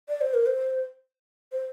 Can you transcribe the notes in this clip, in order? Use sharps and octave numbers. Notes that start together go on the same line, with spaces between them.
D5
C5
A#4
C5
C5